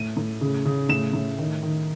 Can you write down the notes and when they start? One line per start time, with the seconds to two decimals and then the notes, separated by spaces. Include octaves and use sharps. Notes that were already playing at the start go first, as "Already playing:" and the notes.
Already playing: A2 D#7
0.17 A2
0.41 C#3
0.65 C#3
0.89 A2 E7
1.13 A2
1.39 D#3
1.63 D#3